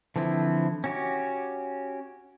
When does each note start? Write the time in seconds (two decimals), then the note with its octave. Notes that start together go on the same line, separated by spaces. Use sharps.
0.16 D3 E3 F3 C4 E4
0.84 C#4 F#4 G4